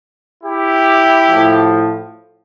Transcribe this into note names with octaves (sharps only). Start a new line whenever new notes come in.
E4 G4
A2 F3